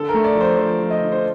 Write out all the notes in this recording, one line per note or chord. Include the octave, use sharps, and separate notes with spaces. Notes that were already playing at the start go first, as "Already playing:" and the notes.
Already playing: D3 A4
A#4
A3
D5
F3
C5
F3 C5
F3
D#5
D3
C5